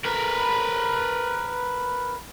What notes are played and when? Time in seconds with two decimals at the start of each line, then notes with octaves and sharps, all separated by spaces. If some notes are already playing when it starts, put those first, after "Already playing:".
0.05 A#4 B4